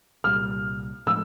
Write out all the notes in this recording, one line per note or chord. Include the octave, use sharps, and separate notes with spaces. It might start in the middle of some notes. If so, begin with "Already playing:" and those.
C2 A#2 G3 F6
A2 F3 G#3 E6